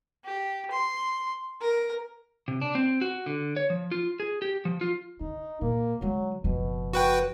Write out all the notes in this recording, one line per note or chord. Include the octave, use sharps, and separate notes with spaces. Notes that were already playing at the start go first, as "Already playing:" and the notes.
G4
C6
A#4
C3
D4
C4
F#4
D3
C#5
F3
F4
G#4
G4
F3
F4
D3 D#4
A#2 A#3
D3 F#3 G#3
F#1 B2 F3
F#4 B4 G5